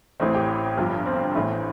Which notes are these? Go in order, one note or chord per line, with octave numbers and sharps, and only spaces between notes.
A1 A2 E3 A3 C4
G4
G1 G2 F3
C4
A1 A2 E3 A3